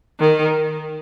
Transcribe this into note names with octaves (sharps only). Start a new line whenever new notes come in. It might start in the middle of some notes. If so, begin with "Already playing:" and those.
D#3